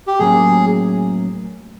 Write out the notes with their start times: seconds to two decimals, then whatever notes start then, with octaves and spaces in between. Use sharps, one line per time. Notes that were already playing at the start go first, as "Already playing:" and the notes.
0.07 G4
0.19 A2 F#3 A#3 C#4 G#4